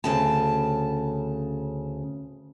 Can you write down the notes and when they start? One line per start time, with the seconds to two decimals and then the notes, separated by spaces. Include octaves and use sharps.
0.04 D2 C#3 A5